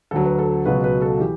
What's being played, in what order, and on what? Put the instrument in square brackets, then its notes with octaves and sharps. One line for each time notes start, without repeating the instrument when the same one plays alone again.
[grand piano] D2 D3 F#3 A4
B4
A4
C#2 B2 F#3 B4
B4
A4
E3 G4